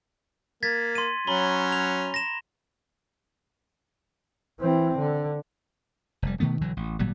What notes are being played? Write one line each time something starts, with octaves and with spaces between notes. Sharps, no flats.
A#3 G#6 A6 B6
C6 D#7
F#3 C#4 A#5 B5 G7
F7
A#6 E7
E3 C4
D3
F1 G3
B2 D#3 A3 B3
B1 D3 E3 F#3
A1
G#1 A#2 F#3 G3